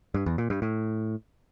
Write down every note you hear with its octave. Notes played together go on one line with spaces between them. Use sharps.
G2
E2
A#2
G2
A2